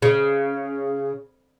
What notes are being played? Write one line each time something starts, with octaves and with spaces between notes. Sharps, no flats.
C#3